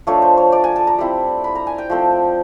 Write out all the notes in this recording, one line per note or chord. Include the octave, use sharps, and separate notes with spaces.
F3 A3 D4 C#5
C5
C#5
D5
G#5
A5
A#5
G3 C4 E4
B5
A#5
G#5
G5
F3 A3 C4